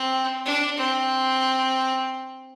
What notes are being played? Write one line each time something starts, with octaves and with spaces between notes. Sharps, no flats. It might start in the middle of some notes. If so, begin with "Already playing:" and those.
Already playing: C4
D4
C4